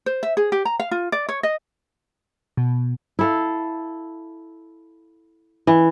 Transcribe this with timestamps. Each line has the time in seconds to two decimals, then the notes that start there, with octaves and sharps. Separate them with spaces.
0.06 C5
0.23 E5
0.37 G#4
0.52 G4
0.65 A#5
0.80 F5
0.91 F4
1.12 D5
1.29 C#5
1.43 D#5
2.57 B2
3.19 E4 A4 F5
5.67 E3